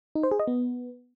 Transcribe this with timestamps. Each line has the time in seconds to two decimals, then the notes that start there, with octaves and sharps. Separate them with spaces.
0.15 D#4
0.23 C5
0.31 G#4
0.40 D#5
0.48 B3